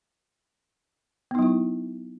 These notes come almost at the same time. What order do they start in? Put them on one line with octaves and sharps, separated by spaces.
B3 D#4 F#3 E4